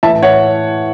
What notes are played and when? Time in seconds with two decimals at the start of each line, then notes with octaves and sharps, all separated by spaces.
0.03 A2 E3 E5 A5
0.22 C#5 F#5